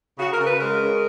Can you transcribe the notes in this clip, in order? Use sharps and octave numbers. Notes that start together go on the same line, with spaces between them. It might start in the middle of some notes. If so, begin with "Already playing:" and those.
C#3 F#4
A#4
C#3
B4
G#3 A#4
C#4